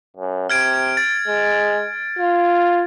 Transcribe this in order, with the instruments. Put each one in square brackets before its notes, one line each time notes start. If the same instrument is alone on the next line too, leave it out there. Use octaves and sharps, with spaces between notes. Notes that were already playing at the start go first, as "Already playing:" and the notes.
[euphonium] F#2
[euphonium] C3 [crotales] F6 G#6 D7
[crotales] A6
[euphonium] G#3
F4